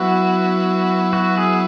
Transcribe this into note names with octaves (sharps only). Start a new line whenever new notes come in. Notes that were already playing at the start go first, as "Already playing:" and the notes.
Already playing: F#3 B3 E4 F#4
F#4
G#4